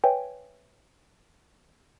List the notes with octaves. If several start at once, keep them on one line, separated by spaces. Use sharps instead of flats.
B4 C#5 E5 G5 G#5